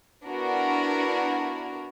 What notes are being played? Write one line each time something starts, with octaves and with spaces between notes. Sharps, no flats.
B3 D4 E4 F#4 A#4